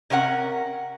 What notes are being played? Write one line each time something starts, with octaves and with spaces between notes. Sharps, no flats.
C3 C#4 A#4 F#5